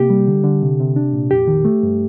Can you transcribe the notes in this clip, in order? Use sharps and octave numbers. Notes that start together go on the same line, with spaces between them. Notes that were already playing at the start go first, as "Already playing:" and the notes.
Already playing: C3 A#3 G4
G3
D3
D3
C3
C3
D4
A#2
F2 G4
D#3
A3
G2